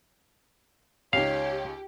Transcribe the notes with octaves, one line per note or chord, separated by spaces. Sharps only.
C#2 D#4 G4 C#5 F5